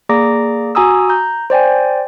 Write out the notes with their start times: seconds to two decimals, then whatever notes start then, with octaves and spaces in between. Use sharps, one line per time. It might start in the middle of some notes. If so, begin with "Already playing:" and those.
0.09 A#3 G#4 D5 A#5 D6 A#6
0.75 F#4 G#5 A#5 D#6 E6
1.09 A#5 G6
1.50 C5 D5 G5 G#5